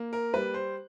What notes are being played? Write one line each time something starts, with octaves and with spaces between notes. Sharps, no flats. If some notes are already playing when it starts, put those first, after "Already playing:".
Already playing: A#3
A#4
G3 B4
C5